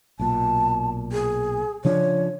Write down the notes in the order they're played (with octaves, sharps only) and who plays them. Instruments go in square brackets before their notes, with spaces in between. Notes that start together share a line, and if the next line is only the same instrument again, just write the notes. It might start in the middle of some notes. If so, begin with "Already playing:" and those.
[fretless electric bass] B1 A#2 [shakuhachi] A5
[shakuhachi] G#4
[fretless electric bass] C#3 F3 D4 [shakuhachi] C#5